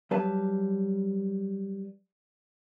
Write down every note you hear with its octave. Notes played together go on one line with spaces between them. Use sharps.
F#3 G3 B4 A5